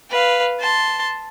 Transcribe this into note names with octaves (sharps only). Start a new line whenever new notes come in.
B4 F5
A5 C6